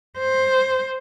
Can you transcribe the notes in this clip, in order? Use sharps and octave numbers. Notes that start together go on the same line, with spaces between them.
C5